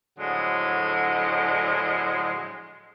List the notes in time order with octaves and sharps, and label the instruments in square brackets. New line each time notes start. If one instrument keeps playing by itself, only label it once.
[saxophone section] A2 D3 F3 F#3 G#3